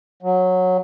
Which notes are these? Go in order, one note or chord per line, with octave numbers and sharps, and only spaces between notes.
F#3